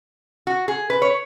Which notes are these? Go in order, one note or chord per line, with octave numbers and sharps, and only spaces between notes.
F#4
G#4
B4
C#5